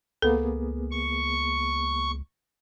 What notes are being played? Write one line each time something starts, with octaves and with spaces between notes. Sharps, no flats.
C#2 A#3 B3 G#4 A4
C#6